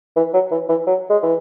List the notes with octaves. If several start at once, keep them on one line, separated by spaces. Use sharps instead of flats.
E3
F#3
E3
E3
F#3
G#3
E3